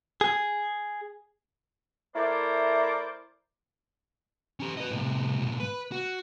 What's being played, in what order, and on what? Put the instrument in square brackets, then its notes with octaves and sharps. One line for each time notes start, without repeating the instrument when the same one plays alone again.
[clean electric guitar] G#4
[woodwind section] A3 E4 A#4 C5 D5
[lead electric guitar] C#4 G4
B4 D#5
A2 C3
G#2 B2
B4
F#4